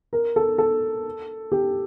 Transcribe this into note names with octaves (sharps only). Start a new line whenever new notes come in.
A#4
A4
A4
G4